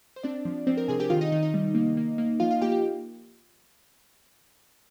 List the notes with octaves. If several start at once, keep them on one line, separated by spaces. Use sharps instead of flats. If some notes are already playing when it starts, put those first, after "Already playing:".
C5
C4 D4 D5
F3
F3 C4 C5
A#4
C3 G#4 G#5
G4 G5
D#3 F4 F5
D#4 D#5
D#3 D#4 D#5
D#4 D#5
G3
A#3
A#3
A#3
F3 F4 F5
F4 F5
A#3 G4 G5
G4